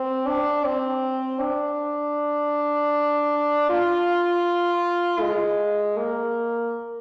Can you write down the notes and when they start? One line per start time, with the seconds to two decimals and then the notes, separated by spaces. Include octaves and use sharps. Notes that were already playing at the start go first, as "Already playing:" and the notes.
Already playing: C4
0.27 D4
0.65 C4
1.40 D4
3.70 F4
5.21 G#3
5.97 A#3